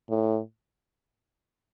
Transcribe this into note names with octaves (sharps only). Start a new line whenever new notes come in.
A2